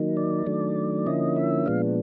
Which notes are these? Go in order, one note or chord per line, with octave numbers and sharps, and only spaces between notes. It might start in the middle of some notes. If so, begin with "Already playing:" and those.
Already playing: D#3 F#3 A#3 D#4
D5
D#3 F#3 A3 D4
D3 F3 A#3 C#4 E4 D#5
E5
A#2 F3 G#3 B3 D4 F5